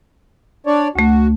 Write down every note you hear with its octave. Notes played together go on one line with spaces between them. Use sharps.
D4 C#5 D5
D2 A3 F#4